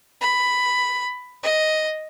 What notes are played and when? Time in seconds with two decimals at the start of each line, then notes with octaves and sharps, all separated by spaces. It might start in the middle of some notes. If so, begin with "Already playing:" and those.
0.21 B5
1.43 D#5